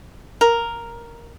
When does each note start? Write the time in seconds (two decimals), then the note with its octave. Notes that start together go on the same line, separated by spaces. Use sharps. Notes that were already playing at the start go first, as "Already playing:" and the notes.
0.41 A#4